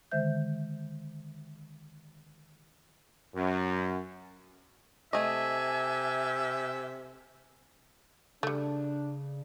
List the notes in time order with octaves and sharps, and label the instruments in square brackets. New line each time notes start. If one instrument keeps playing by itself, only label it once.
[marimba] D3 D#3 G#3 C5 E5 G6
[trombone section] F#2
[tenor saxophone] C3 [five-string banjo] A3 D#5 [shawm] E5 [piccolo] G#5
[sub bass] C#3 [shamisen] G3 A3 [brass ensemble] D4